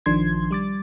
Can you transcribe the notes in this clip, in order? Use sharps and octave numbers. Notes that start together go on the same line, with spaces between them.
A#1 D#3 F3 D4 C6 G#6
G3 D6 A6